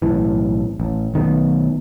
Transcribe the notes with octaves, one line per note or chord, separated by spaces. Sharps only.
B1 A2 E3
A1
B1 D#3 A3 B3